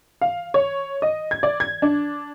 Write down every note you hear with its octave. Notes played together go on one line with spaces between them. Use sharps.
F5
C#5
D#5
G#6
D5
G#6
D4